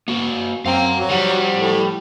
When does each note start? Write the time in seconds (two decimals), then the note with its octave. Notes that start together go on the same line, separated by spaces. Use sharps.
0.08 A#3 F#4
0.66 F#2 C4 F5 A#5
0.94 F#3
1.10 F3 G3 C5 F#5
1.54 A2